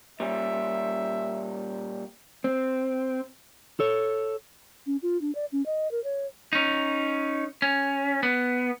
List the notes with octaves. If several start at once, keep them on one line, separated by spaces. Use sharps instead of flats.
A#2 G3 C#4 E5
C4
A4 C#5
C#4
F4
D4
D5
C#4
D#5
A#4
C#5
C#4 D#4
C#4
B3